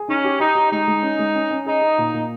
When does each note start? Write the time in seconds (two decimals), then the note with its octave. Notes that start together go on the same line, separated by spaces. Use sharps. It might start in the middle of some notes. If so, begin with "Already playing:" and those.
Already playing: G#4
0.08 C#4 D#4
0.24 G4
0.40 D#4 G4
0.55 G4
0.71 G#3 D#4
0.88 G#3
1.03 C#4
1.19 G#3
1.35 C#4
1.51 C#4
1.66 D#4 G#4
1.82 G#4
1.98 A#2
2.13 A#2